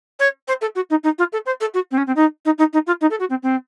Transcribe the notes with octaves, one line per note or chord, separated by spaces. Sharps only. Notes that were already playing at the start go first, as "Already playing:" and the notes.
C#5
C5
A4
F#4
D#4
D#4
F4
A4
C5
A4
F#4
C4
C#4
C4
D#4
D#4
D#4
D#4
F4
D#4
A4
F#4
C4
C4